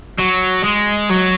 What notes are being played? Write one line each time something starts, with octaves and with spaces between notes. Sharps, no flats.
F#3
G#3
F#3